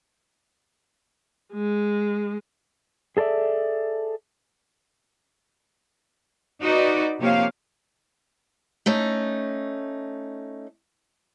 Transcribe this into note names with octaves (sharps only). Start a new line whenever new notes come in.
G#3
G#4 A4 C5 D5 E5
D#4 F#4 B4 D5
C3 F3 A#3 G4 C#5 F5
A3 C#4 D#4